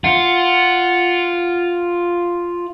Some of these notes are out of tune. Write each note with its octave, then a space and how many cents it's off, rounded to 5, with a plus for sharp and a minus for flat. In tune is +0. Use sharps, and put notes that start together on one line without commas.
F4 +0 F#5 +0